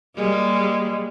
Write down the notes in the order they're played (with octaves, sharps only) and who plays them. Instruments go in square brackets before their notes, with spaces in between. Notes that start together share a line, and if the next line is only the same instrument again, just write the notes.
[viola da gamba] G3 G#3 A#3